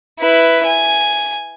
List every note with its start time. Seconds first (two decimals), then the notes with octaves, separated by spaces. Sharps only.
0.19 E4 B4
0.66 G#5